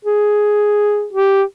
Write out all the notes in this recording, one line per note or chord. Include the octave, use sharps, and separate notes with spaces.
G#4
G4